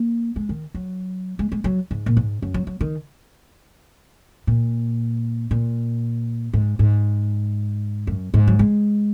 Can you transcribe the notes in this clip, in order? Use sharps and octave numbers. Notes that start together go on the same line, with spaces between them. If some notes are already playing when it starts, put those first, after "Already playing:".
Already playing: A#3
G#3
D#3
F#3
G#3
G#3
F#3
G#2
A#2
G#2
F#2
F#3
F#3
D#3
A#2
A#2
G#2
G#2
F#2
G#2
F#3
G#3